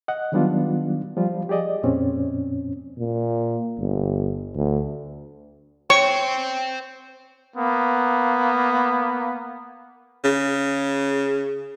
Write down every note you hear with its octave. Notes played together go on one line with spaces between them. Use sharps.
D#5 F#5
D#3 F#3 G3 B3 D4 F4
F3 G3 F4
G4 G#4 D5 D#5
F2 A#2 C4 C#4
A#2
G1
D2
C5 C#5 G5 C#6
A#3 B3
C#3